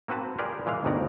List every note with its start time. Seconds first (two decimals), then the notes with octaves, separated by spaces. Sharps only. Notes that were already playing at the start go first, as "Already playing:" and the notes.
0.08 A#3 C4 F#4 B4 A5
0.38 F4 G4 G#4 A#4 B4 D5
0.66 A#2 E3 G#3 F5
0.84 G1 D2 D#3 B3 D5 A#5